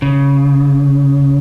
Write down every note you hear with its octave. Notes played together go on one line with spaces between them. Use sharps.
C#3